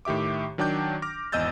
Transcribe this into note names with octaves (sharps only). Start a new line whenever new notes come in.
A2 D#3 G4 E5 D6
D#3 F#3 D4 G5 D6 G6
D6 F6 A#6
G#1 E2 D#5 E6 G6 A6